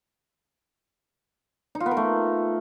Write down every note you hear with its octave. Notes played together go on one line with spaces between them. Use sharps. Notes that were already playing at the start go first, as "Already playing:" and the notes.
D#4
F4
B3
A#4
A3